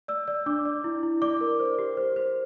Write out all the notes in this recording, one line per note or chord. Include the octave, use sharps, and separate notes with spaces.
D5 E6
D5
D4 D6
D5
E4
E4
D5 D6
A#4
C5
G4
C5
C5